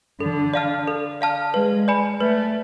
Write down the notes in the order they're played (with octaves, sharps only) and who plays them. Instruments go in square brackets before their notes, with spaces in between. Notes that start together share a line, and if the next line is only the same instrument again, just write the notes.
[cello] D3 [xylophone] A4
[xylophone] D5 F5 A5 F6
A4
D5 F5 A5 F6
[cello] G#3 [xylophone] B4
[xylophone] D5 G#5 B5
[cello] A3 [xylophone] B4